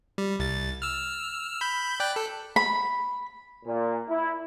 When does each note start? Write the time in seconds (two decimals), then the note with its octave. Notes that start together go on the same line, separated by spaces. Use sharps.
0.18 G3
0.39 C2 A6
0.82 E6 F6
1.61 B5 G6
2.00 D5 G5 F#6
2.16 A4
2.56 B5
3.65 A#2
4.09 E4